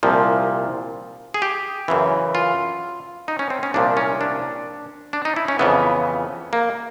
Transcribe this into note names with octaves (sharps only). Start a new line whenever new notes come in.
C2 A#2 F3
G#4
G4
F#2 C#3 E3
F4
D#4
C#4
C4
C#4
C2 A#2 F3 D4
C#4
D4
D4
D#4
E4
C#4
F2 C#3 E3 B3
A#3